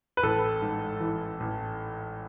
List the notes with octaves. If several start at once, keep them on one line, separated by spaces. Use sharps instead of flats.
B4
A1 A4
G#2
E3
A1